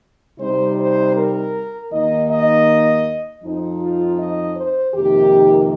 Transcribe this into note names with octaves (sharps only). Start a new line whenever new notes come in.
C3 G3 D#4 C5
C5
A#4
D#2 D#3 A#3 D#4 D#5
D#5
F2 F3 C4 D#4
F4
D#5
C5
F2 C3 D#3 A#3 D#4 G4